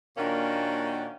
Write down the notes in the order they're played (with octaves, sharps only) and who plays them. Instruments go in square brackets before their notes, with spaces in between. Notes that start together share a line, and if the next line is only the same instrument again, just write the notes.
[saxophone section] A#2 D#3 A#3 C#4 D4 F#4